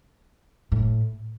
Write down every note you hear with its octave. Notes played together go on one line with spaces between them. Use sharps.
A2